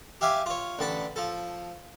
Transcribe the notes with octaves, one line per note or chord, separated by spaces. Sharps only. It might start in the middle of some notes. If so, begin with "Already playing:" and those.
G4 E5 F5 G#5 D6
F4 C#5
A1 D3 A5 B5
F3 A4